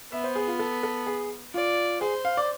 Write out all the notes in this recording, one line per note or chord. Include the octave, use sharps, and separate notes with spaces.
B3 E5
C5
G#4
F4
A4
A4
G#4
F4 D5
G#4 C5
F5
D5